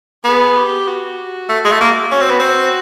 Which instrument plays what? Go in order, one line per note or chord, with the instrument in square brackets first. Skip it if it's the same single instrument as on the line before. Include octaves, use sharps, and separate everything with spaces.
[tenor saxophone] B3 [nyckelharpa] G#4
[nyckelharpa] G4
F#4
[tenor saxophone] A3
G#3
A3
A#3
[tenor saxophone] C#4 [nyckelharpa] F#4
[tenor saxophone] C4
B3
C4